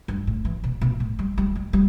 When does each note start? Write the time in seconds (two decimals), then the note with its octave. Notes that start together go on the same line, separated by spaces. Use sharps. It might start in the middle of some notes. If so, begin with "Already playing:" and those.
0.08 G2
0.27 A2
0.45 E3
0.63 B2
0.81 B2
1.00 A2
1.19 G3
1.38 G3
1.55 G3
1.73 G3